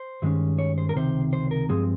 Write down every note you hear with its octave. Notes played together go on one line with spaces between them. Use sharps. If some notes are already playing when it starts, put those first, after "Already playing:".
Already playing: C5
G2 D#3 G#3 C#4
C#5
C5
A#4
C#2 C3 D#3 C5
C5
A#4
G2 F3 G#3 C4 G#4